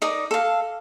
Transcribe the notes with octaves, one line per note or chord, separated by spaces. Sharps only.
D#4 A#4 D5 D#6
A4 F5